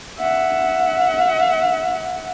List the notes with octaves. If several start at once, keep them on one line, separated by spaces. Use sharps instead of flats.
E5 F#5